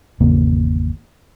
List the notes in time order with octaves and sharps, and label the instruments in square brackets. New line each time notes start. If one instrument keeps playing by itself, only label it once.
[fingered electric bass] G#1 E2 C#3 A#3